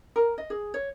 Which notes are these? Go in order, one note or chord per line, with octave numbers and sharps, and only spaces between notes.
A#4
D#5
G#4
C#5